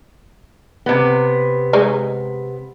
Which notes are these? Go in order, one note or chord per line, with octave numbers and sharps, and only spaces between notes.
C3 B3
G#3 D#4